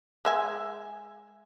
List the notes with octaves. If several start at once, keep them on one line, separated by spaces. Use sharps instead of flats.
G#3 E5 G#5